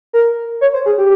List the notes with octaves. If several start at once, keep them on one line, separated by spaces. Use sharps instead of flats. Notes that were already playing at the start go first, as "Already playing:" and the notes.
A#4
C#5
C5
G#4
G4